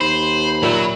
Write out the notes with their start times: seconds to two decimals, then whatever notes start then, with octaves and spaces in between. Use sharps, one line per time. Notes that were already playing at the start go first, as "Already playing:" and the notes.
0.01 D#2 C5 B5
0.63 A#2 F#3 E5 G5